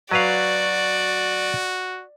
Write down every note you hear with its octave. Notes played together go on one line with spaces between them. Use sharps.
F#3 F#4 B4 D5 F5